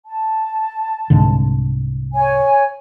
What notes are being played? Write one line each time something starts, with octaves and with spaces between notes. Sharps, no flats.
A5
C2 G#2 D3
C#5 G#5